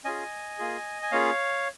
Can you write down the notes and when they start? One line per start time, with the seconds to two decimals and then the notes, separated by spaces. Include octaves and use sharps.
0.05 C#4 F4 G#4 D#5 G#5
0.59 A#3 F4 G#4
1.02 G#5
1.11 A#3 C#4 F4 G#4 C#5 F5